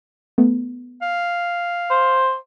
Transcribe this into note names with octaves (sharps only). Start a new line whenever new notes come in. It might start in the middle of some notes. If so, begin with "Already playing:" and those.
A3 B3
F5
C5